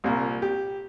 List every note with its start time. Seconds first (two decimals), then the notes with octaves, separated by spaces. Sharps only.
0.04 C2 A#2 A#3
0.42 G4